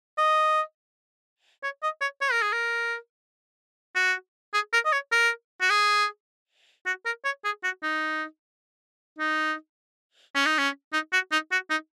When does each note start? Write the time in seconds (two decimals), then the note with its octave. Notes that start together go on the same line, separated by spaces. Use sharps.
0.18 D#5
1.63 C#5
1.83 D#5
2.01 C#5
2.21 C#5
2.32 A#4
2.42 G#4
2.53 A#4
3.95 F#4
4.54 G#4
4.73 A#4
4.85 D#5
4.92 C#5
5.12 A#4
5.61 F#4
5.70 G#4
6.86 F#4
7.06 A#4
7.24 C#5
7.44 G#4
7.64 F#4
7.83 D#4
9.19 D#4
10.35 C#4
10.46 D#4
10.58 C#4
10.93 D#4
11.13 F#4
11.32 D#4
11.52 F#4
11.70 D#4